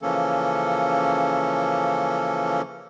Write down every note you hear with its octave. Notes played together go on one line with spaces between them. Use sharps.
C#3 E3 F3 A#3 C#4 A4